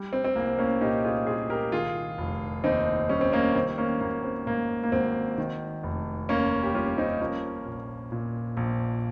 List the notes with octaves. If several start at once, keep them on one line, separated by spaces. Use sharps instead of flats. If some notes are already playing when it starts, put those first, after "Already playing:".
Already playing: G3
C4
C4
C2 A#3
A#3 C#4
A#2 D#4 G4
F4 G#4
C2 F4 G#4
G4 A#4
D#3 F4 G#4
F1
D#2 C4 D#4
G3 C#4
C4
A#3 C#4
D#3 C4
A#3 C#4
G#1 A#3
C4
G#2 A#3
A#3
G#1 C4
D#3
F1
D#2 A#3 C#4
G4
G3 C#4 F4
C4 D#4
F3 A#3 C#4
A#1
A#2
A#1